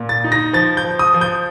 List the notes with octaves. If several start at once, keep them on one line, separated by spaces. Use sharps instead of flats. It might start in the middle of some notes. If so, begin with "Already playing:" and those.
Already playing: A#2
A6
D#4
A#6
F3 A6
G6
F3
D#6
F3
G6